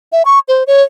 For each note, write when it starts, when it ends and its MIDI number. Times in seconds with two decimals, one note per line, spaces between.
0.12 0.23 76
0.25 0.39 85
0.48 0.63 72
0.67 0.83 73